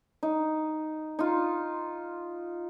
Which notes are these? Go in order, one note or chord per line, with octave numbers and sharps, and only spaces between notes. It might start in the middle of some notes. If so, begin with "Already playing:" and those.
D#4
D#4 F4